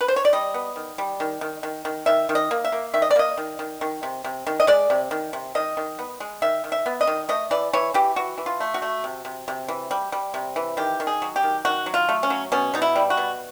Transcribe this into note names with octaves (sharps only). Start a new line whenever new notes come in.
B4
C5
C#5
D5
G3 D#5
B3
D#3
G3
D#3
D#3
D#3
D#3
D#3 E5
D#3
D#5
A#3
E5
A#3
D#3 E5
D#5
D5
A#3 D#5
D#3
D#3
D#3
C3
C3
D#3
D#5
G#3 D5
C3
D#3
C3
D#3 D#5
D#3
B3
G#3
D#3 E5
D#3
E5
B3
D#5
D#3
A3 D#5
E3 D5
E3 C#5
E3 G4
E3 F#4
E3
F4
A3
F#4
A3
C3
C3
C3
E3
G3
G3
C3
E3
D#3 G4
D#3
G#4
F#3
G4
D#3
D#3 F#4
F#3
F4
A3
C#4
F#3
B2 C#4
B2 D#4
E4
G3
F#4
B2